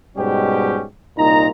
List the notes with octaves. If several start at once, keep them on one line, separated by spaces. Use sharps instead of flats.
G#2 B2 G3 C#4 G4 G5
C2 A#2 D#4 A#5